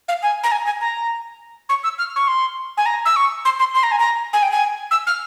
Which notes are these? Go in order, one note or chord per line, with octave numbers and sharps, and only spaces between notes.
F5
G#5
A#5
G#5
G#5
A#5
C#6
E6
F6
C#6
C6
G#5
A#5
E6
C#6
C6
C6
C6
A#5
G#5
A#5
G#5
G5
G#5
E6
F6